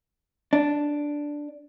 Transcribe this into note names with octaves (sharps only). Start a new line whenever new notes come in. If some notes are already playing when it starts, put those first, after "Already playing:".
D4